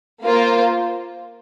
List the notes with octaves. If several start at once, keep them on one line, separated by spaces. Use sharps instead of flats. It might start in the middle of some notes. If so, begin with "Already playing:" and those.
A#3 F4 C5